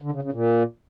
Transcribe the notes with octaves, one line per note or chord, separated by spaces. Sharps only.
D3
C#3
C#3
A#2